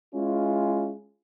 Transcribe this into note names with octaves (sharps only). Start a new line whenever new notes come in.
G#3 C#4 E4 F4